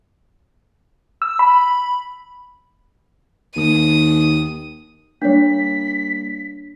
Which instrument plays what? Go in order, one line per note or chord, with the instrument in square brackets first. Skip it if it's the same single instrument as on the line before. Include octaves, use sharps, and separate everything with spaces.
[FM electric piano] E6
B5
[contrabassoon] D#2 [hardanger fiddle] D#6
[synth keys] G3 A#3 [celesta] D4 C#5 [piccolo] B6